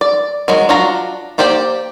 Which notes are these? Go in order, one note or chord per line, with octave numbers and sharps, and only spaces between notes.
D5
D#3 F#3 G#3
D4 F4 F#4 A#5
A#3 G4 C5 D5 G5